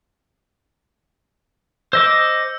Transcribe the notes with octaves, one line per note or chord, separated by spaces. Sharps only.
C5 D#5 D6 E6